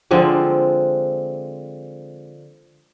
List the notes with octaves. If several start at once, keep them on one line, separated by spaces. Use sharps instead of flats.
D3 F3 G#3 C4